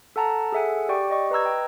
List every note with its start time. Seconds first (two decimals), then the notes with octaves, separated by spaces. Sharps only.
0.16 A4 F#5 A5 A#5
0.52 G#4 A4 E5 F#5 G#5
0.89 G4 D5 G5 C#6
1.08 G4 D5 D#5 C#6
1.31 B4 D#5 A#5 E6 G#6
1.46 G5